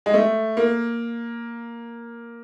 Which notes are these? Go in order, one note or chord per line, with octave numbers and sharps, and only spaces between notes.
G#3
A3
A#3